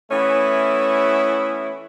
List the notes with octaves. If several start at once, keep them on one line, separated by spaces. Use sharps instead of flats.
E3 A3 B3 C#4 E4